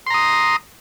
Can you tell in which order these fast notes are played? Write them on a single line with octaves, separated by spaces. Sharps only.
C6 A#5 D#6